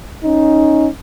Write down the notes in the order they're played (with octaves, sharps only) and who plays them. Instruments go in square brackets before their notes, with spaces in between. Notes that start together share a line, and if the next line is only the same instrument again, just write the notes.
[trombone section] C#4 D#4